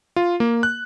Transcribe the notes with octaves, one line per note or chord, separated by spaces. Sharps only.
F4
A#3
F#6